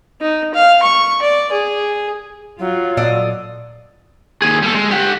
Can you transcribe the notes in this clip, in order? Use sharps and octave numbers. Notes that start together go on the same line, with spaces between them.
D#4
F5
C#6
D5
G#4
F#3 F4
A#2 A4 D5 D#5
D#2 G#4
G3 A4
G#3
G4 F#5